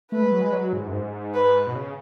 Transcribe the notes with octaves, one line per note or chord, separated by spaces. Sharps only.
A3 B4
G#3
F#3
G#3
F#3
G#2
F#2
G#2
B4
B2
C#3